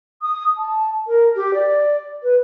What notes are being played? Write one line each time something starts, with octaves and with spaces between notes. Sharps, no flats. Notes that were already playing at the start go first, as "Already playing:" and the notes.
D#6
A5
A#4
G4
D5
B4